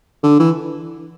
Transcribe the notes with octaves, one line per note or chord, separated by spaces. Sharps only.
D3
E3